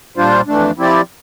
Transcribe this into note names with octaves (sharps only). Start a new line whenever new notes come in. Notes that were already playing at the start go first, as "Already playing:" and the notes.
A#2 G3 D4 F4 C5
F2 E3 A3 D4
F3 C4 E4 G4 D5